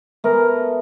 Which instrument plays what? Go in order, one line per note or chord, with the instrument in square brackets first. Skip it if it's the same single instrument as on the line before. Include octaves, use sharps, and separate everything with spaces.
[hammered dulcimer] A3 B3 [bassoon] A#4